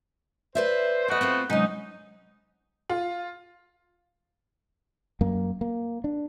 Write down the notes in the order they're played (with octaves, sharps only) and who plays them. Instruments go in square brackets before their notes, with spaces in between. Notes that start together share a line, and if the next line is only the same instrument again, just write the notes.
[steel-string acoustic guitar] B4 D5 E5 [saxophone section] C5
[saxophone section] A3 B3 F#4 [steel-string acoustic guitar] D5 D#5
[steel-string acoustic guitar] C4 F4 C5
[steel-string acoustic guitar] C3 C#4 [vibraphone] F#3 G#3 D#5 [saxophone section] D#4
[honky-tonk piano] F4
[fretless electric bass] F#2 A#3
A#3
D4